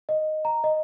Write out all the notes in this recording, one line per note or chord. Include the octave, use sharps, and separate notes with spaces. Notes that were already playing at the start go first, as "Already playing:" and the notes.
D#5
A#5
D#5